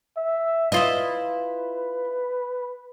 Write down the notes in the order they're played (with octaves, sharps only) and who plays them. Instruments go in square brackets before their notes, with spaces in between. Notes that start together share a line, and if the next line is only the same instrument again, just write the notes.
[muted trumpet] E5
[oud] E4 F4 D#5 [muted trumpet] B4